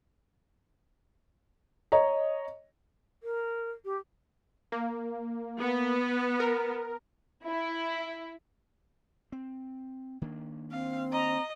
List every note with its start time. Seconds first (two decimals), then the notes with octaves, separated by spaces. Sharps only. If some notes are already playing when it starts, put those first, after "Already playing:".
1.92 C#5 D#5 A#5
3.23 A#4
3.85 G4
4.72 A#3
5.59 B3
6.40 A#4
7.44 E4
9.32 C4
10.22 D#3 A#3 D4
10.72 C4 F5
11.12 D#5 A#5